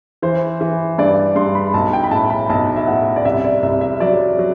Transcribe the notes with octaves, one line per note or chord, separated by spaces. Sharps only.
E3 C5
E3
G2 D5
G2 C6
B5
B1 A5
G5
B5
A2 A5
B5
B1 A5
E5
A2 F#5
D5
C2 E5
D5
C2 E5
E5
F#3 D5
F#3